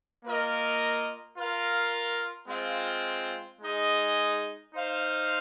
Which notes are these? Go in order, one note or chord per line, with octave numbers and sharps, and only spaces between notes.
A#3 F4 A#4 D#5
F4 A#4 F5
G#3 C4 F4
G#3 D#4 G#4 D#5
D#4 C5 F5